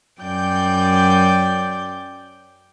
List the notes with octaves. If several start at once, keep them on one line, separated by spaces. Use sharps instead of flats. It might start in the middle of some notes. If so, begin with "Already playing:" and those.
F#2 D5 G5 G6